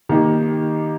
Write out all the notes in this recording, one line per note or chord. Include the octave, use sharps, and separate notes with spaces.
D#3 A#3 D#4 G4